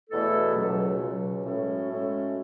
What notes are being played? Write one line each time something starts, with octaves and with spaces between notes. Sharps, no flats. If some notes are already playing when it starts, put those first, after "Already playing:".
E2 B2 A3 E4 A4
C#2 B2 F#3
C#2 B2 F#3
A2 G#3 C#4 F#4 A4
A2 G#3 C#4 F#4 A4